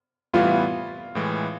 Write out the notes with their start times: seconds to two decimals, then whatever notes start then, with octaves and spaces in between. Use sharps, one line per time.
0.33 A2 E3 G3 B3 E4 F4
1.15 A2 E3 G#3